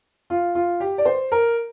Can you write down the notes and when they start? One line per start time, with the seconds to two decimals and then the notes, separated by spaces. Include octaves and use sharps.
0.30 F4
0.55 F4
0.80 G4
0.98 D5
1.05 C5
1.32 A#4